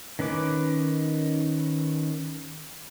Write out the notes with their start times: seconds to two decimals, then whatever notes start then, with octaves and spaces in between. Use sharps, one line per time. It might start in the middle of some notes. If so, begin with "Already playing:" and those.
0.19 D#3 C#4 B4 D6